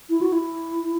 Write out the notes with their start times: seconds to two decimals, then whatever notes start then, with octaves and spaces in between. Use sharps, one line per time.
0.10 E4
0.21 F#4
0.33 E4